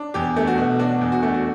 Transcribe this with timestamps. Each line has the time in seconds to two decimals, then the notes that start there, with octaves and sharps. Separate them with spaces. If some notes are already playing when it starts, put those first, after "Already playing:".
Already playing: D4
0.14 E2 G4
0.37 A3
0.47 F#4
0.58 B2
0.80 D4 F#4
1.01 E2
1.12 F#4
1.23 A3
1.34 F#4